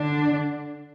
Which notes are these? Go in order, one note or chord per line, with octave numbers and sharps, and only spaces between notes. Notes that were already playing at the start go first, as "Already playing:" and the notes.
Already playing: D3 D4